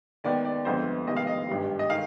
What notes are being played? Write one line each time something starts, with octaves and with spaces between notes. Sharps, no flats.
D#2 D#3 G#3 B3 D5
D5
G1 F2 D3 G#3 B3 C5
F1 D#2 D#3 G#3 B3 D#5
F5
D#5
G#1 G2 D#3 G3
D#5
D#3 G#3 F5